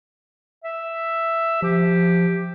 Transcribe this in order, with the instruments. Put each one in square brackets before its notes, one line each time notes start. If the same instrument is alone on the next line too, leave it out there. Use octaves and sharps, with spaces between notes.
[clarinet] E5
[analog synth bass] F3 [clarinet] G4